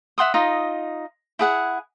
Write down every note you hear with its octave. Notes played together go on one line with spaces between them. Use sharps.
E5 F#5 C6 D#6
D#4 F4 D#5
E4 G#4 F#5